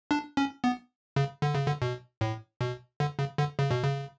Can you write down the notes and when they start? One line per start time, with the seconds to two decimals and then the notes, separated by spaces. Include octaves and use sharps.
0.11 D4
0.37 C#4
0.64 B3
1.16 C#3
1.42 D3
1.54 C#3
1.67 D3
1.82 B2
2.21 A2
2.61 B2
3.00 D3
3.19 C#3
3.38 D3
3.59 C#3
3.71 B2
3.83 C#3